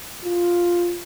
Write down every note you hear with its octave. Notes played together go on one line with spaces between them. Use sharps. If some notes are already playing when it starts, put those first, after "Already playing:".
F4